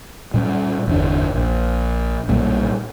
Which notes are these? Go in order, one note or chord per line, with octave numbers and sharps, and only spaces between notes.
A#2 G3 C#4
G1 E2 D4
A#1
B1 A#2 C#3 G3